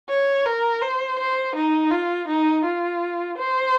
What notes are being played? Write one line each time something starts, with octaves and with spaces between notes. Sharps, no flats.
C#5
A#4
C5
C5
D#4
F4
D#4
F4
C5